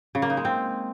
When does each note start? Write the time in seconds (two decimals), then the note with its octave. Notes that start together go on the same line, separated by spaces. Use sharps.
0.15 C#3
0.22 A#3
0.30 D#4
0.37 G#3
0.45 C4